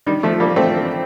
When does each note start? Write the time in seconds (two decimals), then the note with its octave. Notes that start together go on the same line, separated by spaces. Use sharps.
0.07 D#3 G3
0.23 F3 A3
0.40 G3 A#3
0.56 A3 C4